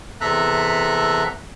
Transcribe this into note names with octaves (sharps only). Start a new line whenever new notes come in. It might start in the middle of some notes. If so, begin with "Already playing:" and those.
E2 C3 A4 E5 A#5 F#6